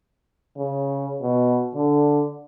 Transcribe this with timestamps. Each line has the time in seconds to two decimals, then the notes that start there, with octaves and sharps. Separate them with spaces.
0.58 C#3
1.22 B2
1.75 D3